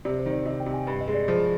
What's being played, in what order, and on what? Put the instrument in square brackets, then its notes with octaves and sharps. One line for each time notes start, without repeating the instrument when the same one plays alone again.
[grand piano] C3 [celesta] D5
[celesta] C5
[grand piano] D#3
[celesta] D5
[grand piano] C3 [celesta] D#5
[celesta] G5
[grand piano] C3
[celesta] G#5
[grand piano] G2
[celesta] D#5
[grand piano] G#3
[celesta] D5
[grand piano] F3 [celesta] G#4